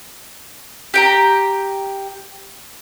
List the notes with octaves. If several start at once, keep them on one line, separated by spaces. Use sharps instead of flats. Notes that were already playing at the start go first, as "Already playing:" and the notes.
G4 G5 A#5